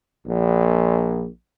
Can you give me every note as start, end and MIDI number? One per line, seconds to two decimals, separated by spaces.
0.26 1.27 34